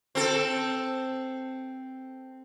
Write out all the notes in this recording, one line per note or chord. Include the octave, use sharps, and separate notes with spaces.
C4 A4